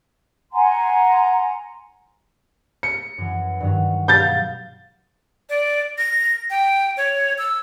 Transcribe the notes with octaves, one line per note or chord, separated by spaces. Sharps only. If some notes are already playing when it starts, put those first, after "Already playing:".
F#5 G#5 A#5 C6
C#7
F#2 E3
G2 D#3 F#3
B2 F5 G6 A6
D5
A#6
G5
C#5
E6